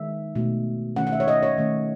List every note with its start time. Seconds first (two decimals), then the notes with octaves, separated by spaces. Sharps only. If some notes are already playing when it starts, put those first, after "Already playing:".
Already playing: D#3 G#3 D#4 E5
0.35 B2 A3 D#4
0.96 D#3 A3 C#4 F#5
1.07 F#5
1.12 E5
1.20 C#5
1.28 D#5
1.43 C#5
1.58 D#3 A3 C#4